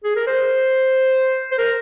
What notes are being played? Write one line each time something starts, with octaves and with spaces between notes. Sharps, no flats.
G#4
A#4
C5
C5
A#4